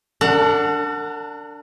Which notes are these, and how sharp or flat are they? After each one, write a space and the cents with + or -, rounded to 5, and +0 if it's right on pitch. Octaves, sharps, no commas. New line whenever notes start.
D4 -5 A#4 -45 F#5 +0